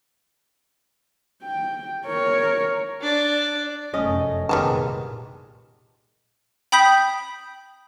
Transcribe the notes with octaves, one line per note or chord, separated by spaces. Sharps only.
G5
A#4 C#5
D4 D5
F1 F#2 A3 C#4 C#5 D#5
C2 A#2 D#3 G3 G#3 B3 A5
G5 B5 D#6 G6 B6